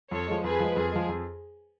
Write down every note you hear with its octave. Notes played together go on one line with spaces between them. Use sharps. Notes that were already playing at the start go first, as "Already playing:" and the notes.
F2 A4 C#5
F3 G#3
F2 G#4 B4
F3 G#3
F2 G#4
F3 G#3
F2